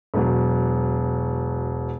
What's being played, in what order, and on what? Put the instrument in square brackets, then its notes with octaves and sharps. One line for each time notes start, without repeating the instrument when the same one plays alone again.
[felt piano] E1 F#3